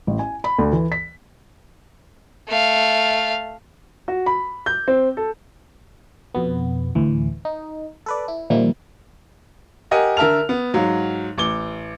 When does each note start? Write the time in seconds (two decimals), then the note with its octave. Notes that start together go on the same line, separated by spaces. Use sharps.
0.07 A1
0.19 G#5
0.44 B5
0.59 D2
0.73 E3
0.92 B6
2.48 A3 F5
4.08 F#4
4.26 B5
4.66 G6
4.88 C4
5.17 A4
6.34 F2 B2 B3
6.95 D2 A2 E3
7.45 D#4
8.06 A4 B4 D5
8.28 E4
8.50 A#2 D#3 F3 G3 A#3 E4
9.91 G4 A#4 D#5 F#5 G#5
10.17 D3 A#4 E5 A5 F6 F7
10.49 B3
10.74 G#2 F#3 F5
11.38 A1 D6 G7